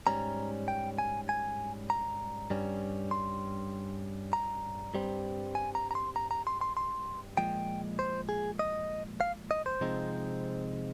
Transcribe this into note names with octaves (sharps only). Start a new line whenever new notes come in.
G#2 G3 C#4 A#5
G5
G#5
G#5
A#5
G2 G3 C#4
C6
A#5
G2 G3 C4
G#5
A#5
A#5
C6
A#5
A#5
C6
C6
C6
A#2 F3 G#3 G5
C5
G#4
D#5
F5
D#5
C5
C3 F3 G#3 C4 D#4